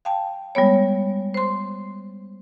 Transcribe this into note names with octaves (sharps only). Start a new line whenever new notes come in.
F5 G5 A5
G3 G#3 B3 C#5
C5 C6